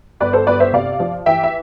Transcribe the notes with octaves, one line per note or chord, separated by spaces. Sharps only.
G1 B4 D5
A4 C5
G1 B4 D5
C5 E5
C3 D5 F5
F3
E3 E5 G5
E5